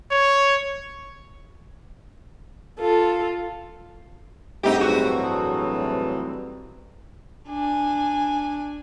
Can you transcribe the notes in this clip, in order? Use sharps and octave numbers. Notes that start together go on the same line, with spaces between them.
C#5
F4 A4
G2 A3 C4 D#4 G4 G#4 F#5 D6
A2 E3 F#3 F#4 G#4 C5
G#4 A5 D#6
D4 G#5